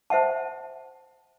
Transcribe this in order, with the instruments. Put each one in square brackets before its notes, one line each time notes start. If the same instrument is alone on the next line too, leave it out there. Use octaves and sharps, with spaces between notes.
[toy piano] C5 E5 F#5 A5